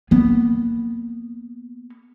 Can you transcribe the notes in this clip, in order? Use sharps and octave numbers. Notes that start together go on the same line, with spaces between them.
A#3 B3